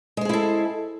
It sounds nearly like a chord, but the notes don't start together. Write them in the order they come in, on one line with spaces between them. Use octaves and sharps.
G#3 C5 G#4 E4 A4